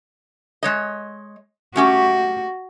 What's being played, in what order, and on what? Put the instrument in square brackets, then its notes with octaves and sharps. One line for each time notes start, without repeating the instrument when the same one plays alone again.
[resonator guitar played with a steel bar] G#3 C#5 D#5
[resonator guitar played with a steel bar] A3 C#4 G4 [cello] F#4